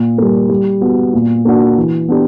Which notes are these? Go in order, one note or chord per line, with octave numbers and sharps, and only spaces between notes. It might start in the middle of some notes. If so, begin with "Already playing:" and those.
Already playing: A#2
G3 A#3
G3
B3 F#4
A#2
A#3 D4 F#4
E3
B3 D4 G4